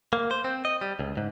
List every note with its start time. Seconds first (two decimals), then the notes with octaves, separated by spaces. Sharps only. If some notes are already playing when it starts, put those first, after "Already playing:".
0.13 A#3
0.31 C5
0.44 C4
0.65 D#5
0.81 G3
0.99 C#2
1.17 G#2